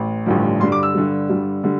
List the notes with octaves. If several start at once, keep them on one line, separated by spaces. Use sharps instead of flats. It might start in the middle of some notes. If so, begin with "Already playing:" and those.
Already playing: A1
A1 G2 D3 F3
G2 D3 G3 C6
D6
E6
G2 D3 G3
G2 D3 G3
D3 G3